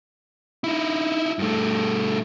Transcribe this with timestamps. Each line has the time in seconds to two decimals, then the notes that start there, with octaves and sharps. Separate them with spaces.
0.64 D#4 E4
1.39 G2 A3